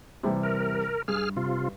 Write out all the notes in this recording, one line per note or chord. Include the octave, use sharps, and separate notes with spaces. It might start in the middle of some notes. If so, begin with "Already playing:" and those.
C3 E3 G3
A#4
G2 G#4 F6
C3 F4